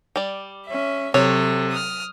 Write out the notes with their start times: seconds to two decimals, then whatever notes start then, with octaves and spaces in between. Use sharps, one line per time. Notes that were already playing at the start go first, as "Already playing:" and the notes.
0.16 G3 D5
0.67 C#4 E5
1.14 C3 F#3 A4 C#5
1.71 D#6 F6